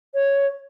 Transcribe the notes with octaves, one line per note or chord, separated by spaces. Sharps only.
C#5